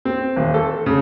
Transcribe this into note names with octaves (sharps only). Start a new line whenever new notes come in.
C4
D#1
A4
C#3